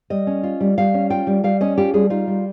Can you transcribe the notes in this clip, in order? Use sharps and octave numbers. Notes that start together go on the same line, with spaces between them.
G3 D#5
C#4
F4
G3
G3 F5
C#4
F4 G5
G3
G3 F5
C#4 D#5
F4 G4
G3 G#4
D#4 F4
G3